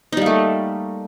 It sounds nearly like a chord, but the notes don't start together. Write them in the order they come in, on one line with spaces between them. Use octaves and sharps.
D#4 G3 A#3 A3